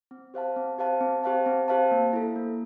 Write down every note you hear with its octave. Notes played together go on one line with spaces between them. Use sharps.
C4
G4 C5 F5 A5
C4
G4 C5 F5 A5
C4
G4 C5 F5 A5
C4
G4 C5 F5 A5
A#3
E4 A4
A#3